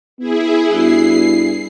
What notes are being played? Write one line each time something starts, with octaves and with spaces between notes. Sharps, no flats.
B3 E4 G#4
G2 B3 E4 F#4 C7